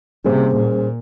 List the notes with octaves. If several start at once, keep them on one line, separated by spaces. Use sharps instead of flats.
C3 G3 A#3 C#4 G#4 C5
A#2